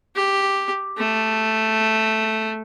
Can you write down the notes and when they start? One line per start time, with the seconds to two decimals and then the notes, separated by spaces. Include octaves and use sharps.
0.16 G4
0.98 A3